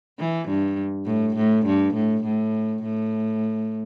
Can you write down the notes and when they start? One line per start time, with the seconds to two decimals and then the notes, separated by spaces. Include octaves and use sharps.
0.19 E3
0.48 G2
1.06 A2
1.36 A2
1.66 G2
1.95 A2
2.24 A2
2.83 A2